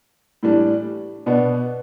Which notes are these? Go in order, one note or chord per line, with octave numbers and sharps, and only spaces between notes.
A2 E3 G3 D4
B2 B3 D4